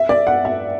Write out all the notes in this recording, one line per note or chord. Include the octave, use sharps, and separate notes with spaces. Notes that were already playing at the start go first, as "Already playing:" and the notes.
Already playing: E5
D5
F#5
E5